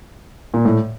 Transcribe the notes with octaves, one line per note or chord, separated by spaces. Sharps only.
A#2
A2